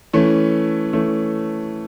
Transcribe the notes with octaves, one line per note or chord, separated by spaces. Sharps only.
E3 A3 C#4
E3 A3 C#4